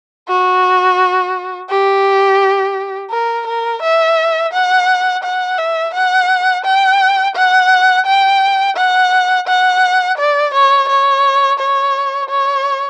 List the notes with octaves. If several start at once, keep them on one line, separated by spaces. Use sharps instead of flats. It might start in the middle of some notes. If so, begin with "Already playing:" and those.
F#4
G4
A#4
A#4
E5
F#5
F#5
E5
F#5
G5
F#5
G5
F#5
F#5
D5
C#5
C#5
C#5
C#5